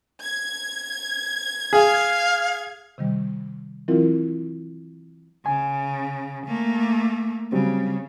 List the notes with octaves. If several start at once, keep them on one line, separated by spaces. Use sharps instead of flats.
G#6
G#4 F5
C3 D#3 G3
E3 F#3 C4 E4 F4 A#4
C#3 G#5
A3 A#3
C#3 F#3 G3 C4